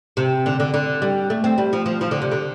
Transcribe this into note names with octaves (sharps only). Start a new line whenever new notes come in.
C3
D3
D3
D3
G3
A3
C4
G3
F3
F3
F3
D3
C3
D3